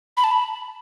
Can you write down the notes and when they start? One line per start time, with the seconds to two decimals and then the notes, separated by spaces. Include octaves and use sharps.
0.17 B5
0.24 A5
0.31 B5